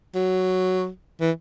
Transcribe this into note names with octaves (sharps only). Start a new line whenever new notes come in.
F#3
E3